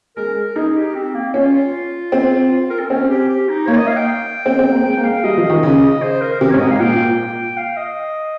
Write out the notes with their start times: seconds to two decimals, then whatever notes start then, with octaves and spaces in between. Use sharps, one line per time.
0.17 G#3 A#4
0.56 D#4 G#4
0.76 G4
0.95 C4
1.15 A#3
1.34 C#4 F4
1.54 F4
2.12 C4
2.52 F4
2.70 A#4
2.80 C4
2.90 C4 C#4
3.10 G4
3.29 G4
3.49 D#4
3.68 A#3 C#5
3.78 D#5
3.87 F5
3.97 G5
4.46 C4
4.59 C4
4.71 A#3
4.85 G#3 G5
4.97 A#3
5.04 F5
5.11 G#3
5.24 G3 D#5
5.37 F3
5.50 D#3
5.63 C#3
6.02 C5
6.22 A#4
6.41 C3 A#4
6.50 G#2 C#5
6.60 D#5
6.67 G#2
6.70 F5
6.80 A#2 G5
7.57 F5
7.77 D#5